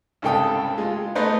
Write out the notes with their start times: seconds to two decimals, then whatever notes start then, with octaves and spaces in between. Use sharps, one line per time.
0.22 C2 G#2 C#3 A4 G5 D#6
0.78 G#3 F4
1.15 A3 B3 D#4 B4 C5 D5